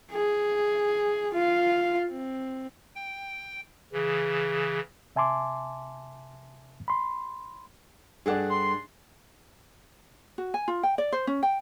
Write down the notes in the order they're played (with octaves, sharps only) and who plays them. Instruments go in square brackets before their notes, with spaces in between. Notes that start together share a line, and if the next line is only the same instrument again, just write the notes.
[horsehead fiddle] G#4
F4 F5
C4
[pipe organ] G5
[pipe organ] C#3 E3 [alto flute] G#4
[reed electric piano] C3 E5 G#5 A5 C6 D6
B5 C6
[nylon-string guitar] G2 A4 F#5 [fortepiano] D4 G#4
[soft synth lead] C6
[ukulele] F#4
G#5
F4
G5
D5
C5
C#4
G5